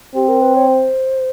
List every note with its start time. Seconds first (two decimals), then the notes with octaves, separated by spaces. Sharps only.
0.16 C4 G4
0.29 A#4
0.42 B4
0.55 C#5
0.68 C5